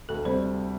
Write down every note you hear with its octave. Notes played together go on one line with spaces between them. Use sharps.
D2 A4
C3 G3 C5